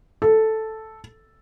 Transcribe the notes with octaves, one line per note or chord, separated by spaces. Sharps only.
A4